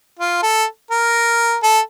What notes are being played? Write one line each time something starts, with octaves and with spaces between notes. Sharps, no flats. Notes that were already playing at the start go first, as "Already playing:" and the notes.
F4
A4
A#4
A4